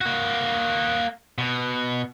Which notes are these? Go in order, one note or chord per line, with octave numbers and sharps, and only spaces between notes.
A#3 F#4
B2